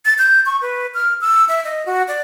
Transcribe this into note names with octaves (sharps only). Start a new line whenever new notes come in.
A6
G6
C#6
B4
F6
E6
E5
D#5
F#4
D5